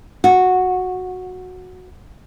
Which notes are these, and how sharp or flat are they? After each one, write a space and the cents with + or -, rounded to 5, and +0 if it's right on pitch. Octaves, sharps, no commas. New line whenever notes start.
F#4 -10